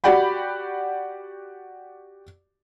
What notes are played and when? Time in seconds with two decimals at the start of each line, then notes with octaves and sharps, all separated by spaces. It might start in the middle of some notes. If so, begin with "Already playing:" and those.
0.04 F#4 G4 D5 F#5 G5 B5